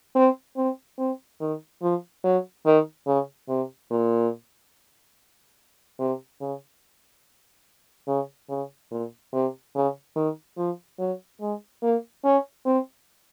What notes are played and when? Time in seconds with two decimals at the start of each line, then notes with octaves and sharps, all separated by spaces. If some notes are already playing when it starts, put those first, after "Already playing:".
0.15 C4
0.57 C4
0.98 C4
1.41 D#3
1.82 F3
2.24 F#3
2.66 D#3
3.07 C#3
3.49 C3
3.91 A#2
5.99 C3
6.41 C#3
8.07 C#3
8.49 C#3
8.91 A#2
9.33 C3
9.75 C#3
10.16 D#3
10.58 F3
10.99 F#3
11.41 G#3
11.83 A#3
12.24 C#4
12.66 C4